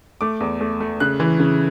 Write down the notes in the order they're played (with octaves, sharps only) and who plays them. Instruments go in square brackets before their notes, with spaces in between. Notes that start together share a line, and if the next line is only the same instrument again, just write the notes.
[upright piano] A3 D6
E2
A3
A3
C#3 F#6
E3
C#3